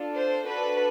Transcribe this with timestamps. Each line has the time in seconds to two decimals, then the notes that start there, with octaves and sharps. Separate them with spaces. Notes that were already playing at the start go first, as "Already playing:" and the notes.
Already playing: D4 F4 A4
0.14 C5
0.48 D4 F#4 A4 B4